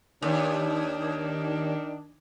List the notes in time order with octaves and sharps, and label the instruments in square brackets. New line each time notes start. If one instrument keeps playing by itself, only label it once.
[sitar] D#2 [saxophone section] D#3 D4